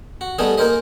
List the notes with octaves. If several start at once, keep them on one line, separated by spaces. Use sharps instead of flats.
F#4
G3 A3 B3 D#4 G#4
A#3 D#4 G#4 A#4 C5 D#5